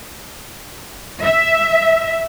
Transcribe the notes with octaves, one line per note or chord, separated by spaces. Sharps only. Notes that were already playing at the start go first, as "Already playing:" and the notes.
E5